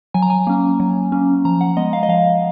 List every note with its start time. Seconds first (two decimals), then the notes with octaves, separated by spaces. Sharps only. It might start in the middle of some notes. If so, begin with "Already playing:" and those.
0.14 F#3 G#5
0.22 A#5
0.30 G#5
0.47 A#3 C#4
0.80 F#3
1.12 A#3 C#4
1.45 F3 A#5
1.61 F#5
1.77 G#3 B3 D#5
1.93 F5
2.03 D#5
2.09 F3 F5